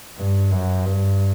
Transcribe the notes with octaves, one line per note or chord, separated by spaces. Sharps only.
G2
F#2
G2